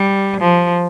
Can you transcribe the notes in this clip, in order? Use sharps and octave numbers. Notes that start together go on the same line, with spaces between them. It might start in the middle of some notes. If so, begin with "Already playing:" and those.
Already playing: G3
F3